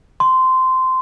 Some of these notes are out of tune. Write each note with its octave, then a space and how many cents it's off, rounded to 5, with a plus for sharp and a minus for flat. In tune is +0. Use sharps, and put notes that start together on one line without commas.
C6 -15